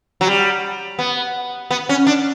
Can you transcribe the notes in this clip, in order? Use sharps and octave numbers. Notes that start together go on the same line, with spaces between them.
F#3
G3
B3
B3
C#4
D4